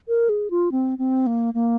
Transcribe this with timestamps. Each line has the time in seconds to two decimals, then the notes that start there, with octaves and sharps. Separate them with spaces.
0.08 A#4
0.29 G#4
0.50 F4
0.71 C4
0.98 C4
1.26 A#3
1.54 A#3